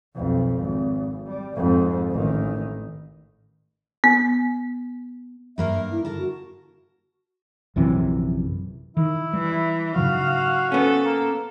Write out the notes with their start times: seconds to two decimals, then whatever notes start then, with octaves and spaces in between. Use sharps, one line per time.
0.15 B1 F2
0.57 G#1
1.27 G3
1.56 F2 G#2
2.11 A1 D#3
4.04 B3
5.58 G2 A#3 A#4 E5
5.91 E4
6.05 D3 A#4 A5
6.18 F#4
7.76 A#1 F#2 C3 E3
8.97 D#3 E4
9.33 E3 G3
9.96 G#2 C#3 F#3 F#4 F5
10.72 B3 C#4 A4
11.05 A#3